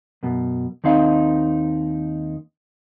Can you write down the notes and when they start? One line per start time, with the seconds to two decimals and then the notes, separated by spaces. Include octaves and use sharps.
0.23 F#2 B2
0.84 D#2 C4 D#4 F5